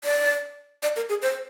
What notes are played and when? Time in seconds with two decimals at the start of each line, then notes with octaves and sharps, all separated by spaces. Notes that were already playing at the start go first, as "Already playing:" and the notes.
0.04 D5
0.83 D5
0.96 A#4
1.09 G#4
1.22 C5